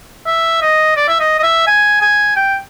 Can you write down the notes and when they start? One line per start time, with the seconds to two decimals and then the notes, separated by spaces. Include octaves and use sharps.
0.27 E5
0.62 D#5
0.96 D5
1.08 E5
1.20 D#5
1.39 D#5
1.43 E5
1.67 G#5
2.01 G#5
2.36 G5